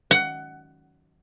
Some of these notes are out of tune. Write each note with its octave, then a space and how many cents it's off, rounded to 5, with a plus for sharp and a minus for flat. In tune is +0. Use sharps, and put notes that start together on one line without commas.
F#5 +15